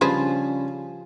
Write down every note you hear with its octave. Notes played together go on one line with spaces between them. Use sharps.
C#3 F3 G3 C#4 D4 G#4 B4 C5